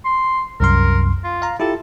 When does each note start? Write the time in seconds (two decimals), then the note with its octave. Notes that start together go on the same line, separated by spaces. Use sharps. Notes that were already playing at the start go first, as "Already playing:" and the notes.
0.05 C6
0.60 C2 F#2 A#4 C6
1.24 F4
1.42 F5 A#5
1.60 E4 F4 G4 A4